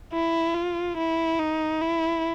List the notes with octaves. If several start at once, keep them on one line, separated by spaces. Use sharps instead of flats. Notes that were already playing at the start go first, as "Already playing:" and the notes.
E4
F4
E4
D#4
E4